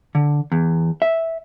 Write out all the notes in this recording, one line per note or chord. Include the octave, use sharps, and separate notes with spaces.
D3
E2
E5